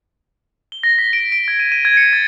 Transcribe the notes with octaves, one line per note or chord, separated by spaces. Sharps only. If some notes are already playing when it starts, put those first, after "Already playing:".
G7
A#6
B6
D7
D7
G#6
D#7
D#7
G#6
C#7
A6